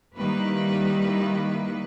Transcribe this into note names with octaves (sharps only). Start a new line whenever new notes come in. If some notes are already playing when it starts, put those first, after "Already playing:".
D#3 G3 A#3 E4 B4